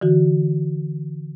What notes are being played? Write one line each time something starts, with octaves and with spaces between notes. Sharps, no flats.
D3 E3 F#4